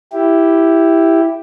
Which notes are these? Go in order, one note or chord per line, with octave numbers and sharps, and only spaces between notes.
E4 G4